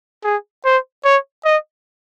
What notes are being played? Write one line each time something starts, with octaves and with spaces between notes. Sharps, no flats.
G#4
C5
C#5
D#5